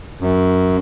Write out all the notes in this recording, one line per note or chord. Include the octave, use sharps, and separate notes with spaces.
F#2